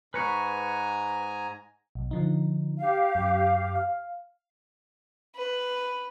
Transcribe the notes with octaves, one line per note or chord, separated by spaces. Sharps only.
G#2 B4 G#5 A#5 C#6
B1
D3 F3 D#4
G4 F5
F#2
F5
B4